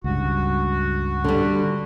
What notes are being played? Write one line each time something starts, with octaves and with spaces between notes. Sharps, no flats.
C#2 G2 F#4
D3 G3